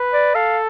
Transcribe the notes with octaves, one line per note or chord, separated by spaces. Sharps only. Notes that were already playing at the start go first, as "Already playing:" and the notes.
Already playing: B4
D5
A4 F5